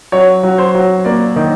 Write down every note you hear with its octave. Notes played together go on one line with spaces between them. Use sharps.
F#3 C#5
F#3
C5
F#3
A#3 D5
D#3